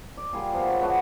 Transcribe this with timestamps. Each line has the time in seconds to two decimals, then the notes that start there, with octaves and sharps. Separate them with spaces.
0.17 D5
0.33 G3 A#3 F4 G#4
0.53 F3 B3 F4 C5
0.66 C#5
0.80 G#3 B3 D4 F#4